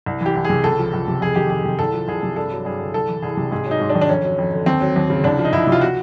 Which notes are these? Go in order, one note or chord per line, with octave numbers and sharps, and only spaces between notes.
C2
E3
G4
C2
G#4
C3
C#2 A4
F3
C#2
C3
F2 G#4
D#3 G4
F2 G#4
C3
C2 A4
F3
C2 G#4
C3
G2 A4
F#3
G2 G#4
D3
C2 A4
E3
C2 G#4
C3
G#2 G#4
F#3
D#4
G#2
D4
D#3
D4
F2 C#4
F#3
F2
D3
D#2 C4
F#3
D#2
C#3
C2 D4
F3
D#4
C2 E4
C3 F4
F#4